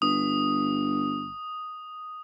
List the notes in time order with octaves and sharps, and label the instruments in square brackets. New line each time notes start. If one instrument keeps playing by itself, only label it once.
[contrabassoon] G1 [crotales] D#6